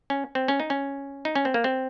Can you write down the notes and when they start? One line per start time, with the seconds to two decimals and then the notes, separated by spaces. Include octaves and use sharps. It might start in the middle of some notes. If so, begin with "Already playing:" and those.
0.10 C#4
0.35 C4
0.48 C#4
0.60 D#4
0.70 C#4
1.25 D#4
1.35 C#4
1.45 C4
1.54 A#3
1.64 C4